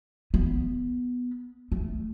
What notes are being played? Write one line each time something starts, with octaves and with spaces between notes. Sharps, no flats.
B3
A3